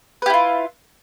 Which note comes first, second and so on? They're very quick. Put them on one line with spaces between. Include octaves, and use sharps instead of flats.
B4 G4 E4 F4